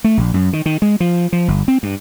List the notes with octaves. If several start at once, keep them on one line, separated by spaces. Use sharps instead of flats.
A3
A#1
F#2
D#3
D#3
G#3
F3
F3
G1
C4
G2